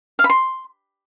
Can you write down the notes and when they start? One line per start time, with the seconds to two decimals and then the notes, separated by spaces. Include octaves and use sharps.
0.19 F5
0.24 B5
0.30 C6